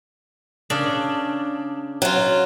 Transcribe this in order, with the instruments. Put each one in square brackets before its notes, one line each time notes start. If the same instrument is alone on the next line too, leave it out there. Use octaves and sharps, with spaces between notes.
[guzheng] C#3 D4
[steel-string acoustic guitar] F#3 F4